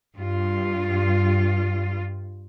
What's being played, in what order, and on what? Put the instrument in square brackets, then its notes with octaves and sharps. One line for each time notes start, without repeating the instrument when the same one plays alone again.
[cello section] G2 F4